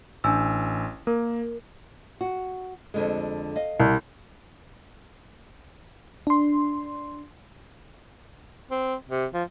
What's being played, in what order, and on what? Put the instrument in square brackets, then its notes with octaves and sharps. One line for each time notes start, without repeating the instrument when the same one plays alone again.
[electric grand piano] A1 [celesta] D4 G#5 E6
[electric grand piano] A#3 [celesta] A#4
[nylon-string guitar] F#4
F2 D3 G#3
D#5 F5
[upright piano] C2
[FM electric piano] D4 C6
[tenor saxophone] C4
C3
F3